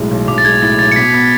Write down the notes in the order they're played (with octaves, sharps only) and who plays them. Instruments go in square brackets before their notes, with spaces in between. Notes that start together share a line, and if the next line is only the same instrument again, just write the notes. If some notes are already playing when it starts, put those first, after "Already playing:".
Already playing: [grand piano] B1 A2 G#3
B1
[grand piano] B1 [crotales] D6
[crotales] A6
[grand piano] G#3 [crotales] G#6
[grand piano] A2 [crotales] A6
[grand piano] B1 [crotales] A6
[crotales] C#7
[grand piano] B2 [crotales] B6
[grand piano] B3